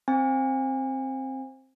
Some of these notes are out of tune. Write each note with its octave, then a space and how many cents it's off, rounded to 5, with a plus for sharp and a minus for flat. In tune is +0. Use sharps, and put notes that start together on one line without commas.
C4 +10 G#5 -35